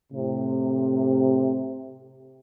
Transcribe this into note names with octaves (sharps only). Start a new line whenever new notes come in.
A2 C3